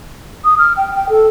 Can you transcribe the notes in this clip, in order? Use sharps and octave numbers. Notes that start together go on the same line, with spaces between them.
D#6
F6
G5
G5
A4